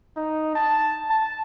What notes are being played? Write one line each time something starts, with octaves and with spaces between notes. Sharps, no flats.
D#4
A5
A5